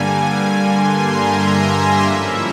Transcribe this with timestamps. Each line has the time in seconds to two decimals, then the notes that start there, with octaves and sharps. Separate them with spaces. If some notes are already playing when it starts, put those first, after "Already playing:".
Already playing: G2 D3 G3 A#3 G#5
0.56 C6
0.93 A#5
1.30 E5
1.66 E5
2.03 G#2 F3 A#3 C#4 E4